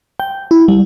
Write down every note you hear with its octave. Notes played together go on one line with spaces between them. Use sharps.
G5
E4
G3